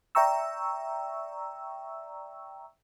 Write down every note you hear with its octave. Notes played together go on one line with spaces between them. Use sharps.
D5 E5 G5 A#5 C#6 E6